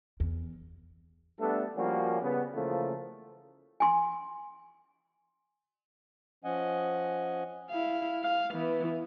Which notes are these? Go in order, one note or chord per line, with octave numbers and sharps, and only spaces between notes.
E2
G3 A3 B3 D4 A4
F3 G3 A#3 C#4 F#4
C#3 G3 B3
C#3 E3 F3 A3 A#3
G#5 C6
F3 C#4 D#5 F#5 G#5
E4 F5
F5
E3 B3